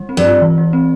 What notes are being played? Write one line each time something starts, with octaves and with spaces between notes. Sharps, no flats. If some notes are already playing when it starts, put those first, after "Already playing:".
Already playing: G3
C4
G2
F4
E3
G3
C4